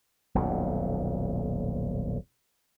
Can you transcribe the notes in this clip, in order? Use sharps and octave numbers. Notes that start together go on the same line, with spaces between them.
D#1 B1 F2 A#2